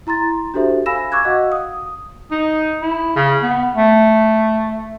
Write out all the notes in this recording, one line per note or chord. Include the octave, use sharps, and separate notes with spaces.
E4 A#5 C6 A6
D4 F#4 G4 A4 C5 E5
F5 G#5 B5 E6 A#6 E7
C#6 D6 E6 F#6 G#6
F#4 D#5 F5 F#5
D#6
D#4
E4
C#3
B3
A3